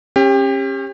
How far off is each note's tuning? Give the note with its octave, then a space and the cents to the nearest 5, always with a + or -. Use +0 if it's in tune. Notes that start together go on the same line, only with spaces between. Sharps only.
C#4 -30 G4 +25